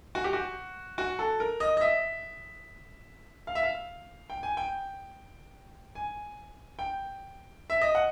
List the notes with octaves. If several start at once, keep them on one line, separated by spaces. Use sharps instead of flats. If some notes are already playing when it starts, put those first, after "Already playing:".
F#4
G4
F#4
F#4
A4
A#4
D#5
D#5
E5
F5
E5
F5
G5
G#5
G5
G#5
G5
E5
D#5
F#5